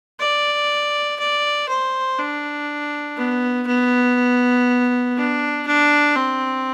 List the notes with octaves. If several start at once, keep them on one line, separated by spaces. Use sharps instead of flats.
D5
D5
C5
D4
B3
B3
D4
D4
C4